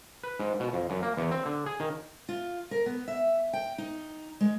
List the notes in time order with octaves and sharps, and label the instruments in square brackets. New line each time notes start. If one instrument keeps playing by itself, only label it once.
[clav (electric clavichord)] B4
G#2
B2
F2
F#2
A#3
E2
C4
D3
G#4
D#3
[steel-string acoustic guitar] F4
A#4
B3
E5
G5
D#4
G#3